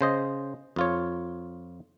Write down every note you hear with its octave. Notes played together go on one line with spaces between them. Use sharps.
C#3 C5 D#5
F2 F4 C#5